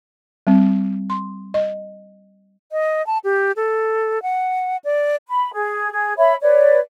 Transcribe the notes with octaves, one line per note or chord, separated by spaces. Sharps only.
G3 C4
C6
D#5
D#5
A5
G4
A4
F#5
D5
B5
G#4
G#4
C#5 E5 B5
B4 C#5 D5